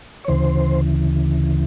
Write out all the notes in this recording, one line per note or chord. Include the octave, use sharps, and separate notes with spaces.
C#5
D2 C#3 E3 C5